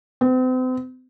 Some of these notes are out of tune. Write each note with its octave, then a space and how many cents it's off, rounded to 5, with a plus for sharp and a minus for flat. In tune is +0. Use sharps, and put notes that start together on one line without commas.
C4 -40